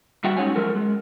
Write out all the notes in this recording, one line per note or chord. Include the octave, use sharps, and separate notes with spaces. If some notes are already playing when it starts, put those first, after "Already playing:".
G3 F#4 E5 F#5 G5
G#3 C#4 D#4 C#5 F#5 G#5
F3 G#3 A4 A#4
G#3